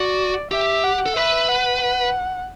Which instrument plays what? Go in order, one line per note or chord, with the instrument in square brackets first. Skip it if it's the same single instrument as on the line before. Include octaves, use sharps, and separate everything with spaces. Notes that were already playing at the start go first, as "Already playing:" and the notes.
Already playing: [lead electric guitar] F#4 [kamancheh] D5
[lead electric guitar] G4 [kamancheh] E5
[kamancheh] F#5
[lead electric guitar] A4
[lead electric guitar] B4 [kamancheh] E5
[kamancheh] F#5
F#5